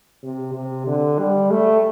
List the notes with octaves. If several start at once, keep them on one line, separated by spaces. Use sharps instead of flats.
C3
C3
D3
G3
A3